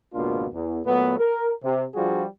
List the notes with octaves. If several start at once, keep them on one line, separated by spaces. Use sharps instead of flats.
G#1 C#2 B2 A#3 D4 F4
E2
A#2 F#3 A3 B3
A#4
C3
F3 G3 D4 F4 F#4 G#4